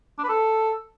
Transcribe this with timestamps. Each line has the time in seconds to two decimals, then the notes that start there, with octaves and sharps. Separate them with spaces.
0.18 D4
0.24 B4
0.29 A4